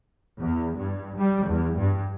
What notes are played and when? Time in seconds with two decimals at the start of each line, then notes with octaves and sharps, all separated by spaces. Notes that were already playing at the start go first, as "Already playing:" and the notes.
0.40 E2
0.78 G2
1.18 G3
1.47 E2
1.78 G2